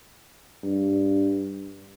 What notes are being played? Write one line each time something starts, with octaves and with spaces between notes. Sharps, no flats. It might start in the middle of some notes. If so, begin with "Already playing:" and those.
G2